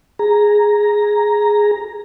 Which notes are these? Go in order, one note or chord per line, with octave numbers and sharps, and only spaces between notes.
G#4 A#5